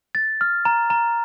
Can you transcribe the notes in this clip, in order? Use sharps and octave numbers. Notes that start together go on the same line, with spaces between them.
A6
F6
A#5
A#5